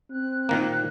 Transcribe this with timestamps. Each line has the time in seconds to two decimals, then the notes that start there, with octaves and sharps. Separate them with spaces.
0.11 C4 F#6
0.49 A#2 D#3 A#3